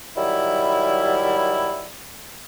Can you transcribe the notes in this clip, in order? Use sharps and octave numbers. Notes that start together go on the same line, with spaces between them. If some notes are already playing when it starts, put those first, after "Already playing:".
D#3 F#3 G3 E4